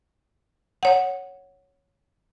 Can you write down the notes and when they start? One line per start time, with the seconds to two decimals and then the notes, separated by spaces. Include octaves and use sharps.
0.83 C#5 F#5